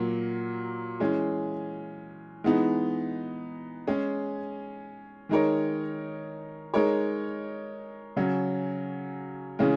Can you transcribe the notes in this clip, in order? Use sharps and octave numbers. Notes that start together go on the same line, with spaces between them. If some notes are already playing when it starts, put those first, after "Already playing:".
Already playing: A#2 F#3 A#3
E3 G#3 C#4 G#4
E3 G#3 B3 D#4
G#3 C#4 G#4
D#3 G#3 D#4 A#4 C#5
G#3 D#4 A#4 C#5
C#3 F#3 C#4
C#3 E3 G#3 C#4